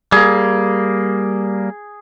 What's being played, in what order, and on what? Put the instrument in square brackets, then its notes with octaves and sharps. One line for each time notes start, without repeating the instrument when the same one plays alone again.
[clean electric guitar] G3 A#3 [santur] G#4